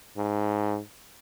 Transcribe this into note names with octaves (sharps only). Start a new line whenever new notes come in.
G#2